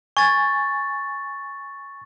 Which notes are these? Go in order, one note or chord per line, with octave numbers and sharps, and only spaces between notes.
G#5 C#6 A6